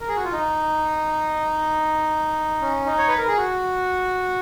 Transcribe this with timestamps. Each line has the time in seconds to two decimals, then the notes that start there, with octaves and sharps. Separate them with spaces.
0.01 A#4
0.08 G#4
0.16 F#4
0.24 F4
0.32 D#4
2.61 C#4
2.86 D#4
2.98 C#5
3.08 B4
3.18 A#4
3.28 G#4
3.37 F#4